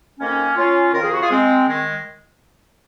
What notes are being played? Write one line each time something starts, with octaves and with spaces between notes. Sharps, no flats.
F2 D#3 A#3 C#4
C#4 F4
F2 D#3 A#4
G#4
F#4
F4 G#4
G#3 C4
D#3 G#3